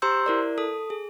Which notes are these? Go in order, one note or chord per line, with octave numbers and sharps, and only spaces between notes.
G4 C5 A#5 C6 E6 G6
E4 A#4 D5
A4 D#6
G#4